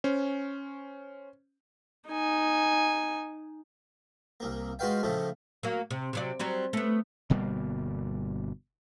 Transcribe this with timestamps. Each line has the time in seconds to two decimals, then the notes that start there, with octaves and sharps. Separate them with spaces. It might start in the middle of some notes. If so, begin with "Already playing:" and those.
0.04 C#4 C5
2.09 D#4 G#5
4.40 C2 A#3
4.79 G#3 F4 F#4 B4 F5 G5
5.03 A2 C#3 F3 A3
5.63 F#3 A#3
5.91 C3
6.13 C3 F#3 D5
6.39 F#3 G3 C4
6.73 A3 B3
7.30 G1 B2 G3 A#3